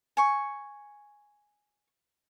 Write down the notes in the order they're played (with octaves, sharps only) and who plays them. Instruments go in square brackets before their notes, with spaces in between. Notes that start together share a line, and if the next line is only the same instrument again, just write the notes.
[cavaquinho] G#5 C#6